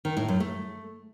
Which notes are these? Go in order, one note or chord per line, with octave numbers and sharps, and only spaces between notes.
D#3
A2
F#2
A3